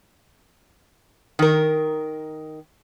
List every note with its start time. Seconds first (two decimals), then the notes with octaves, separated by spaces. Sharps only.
1.39 D#3 A#4